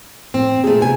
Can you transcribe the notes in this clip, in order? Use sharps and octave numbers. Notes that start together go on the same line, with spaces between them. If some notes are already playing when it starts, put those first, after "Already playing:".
A2 C4
A#2 A3 G#4
C3 B3 G#5